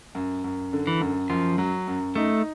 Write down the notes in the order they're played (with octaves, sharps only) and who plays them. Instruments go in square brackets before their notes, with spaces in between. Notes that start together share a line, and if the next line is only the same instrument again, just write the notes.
[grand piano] F#2
F#2
D3
[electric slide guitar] E3
[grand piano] F#2
[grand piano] F#2 [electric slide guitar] F3
[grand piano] F#3
F#2
[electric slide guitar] A3 [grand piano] D#4